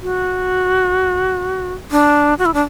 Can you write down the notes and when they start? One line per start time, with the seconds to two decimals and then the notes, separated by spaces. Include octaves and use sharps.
0.02 F#4
1.92 D4
2.39 F#4
2.46 E4
2.54 D4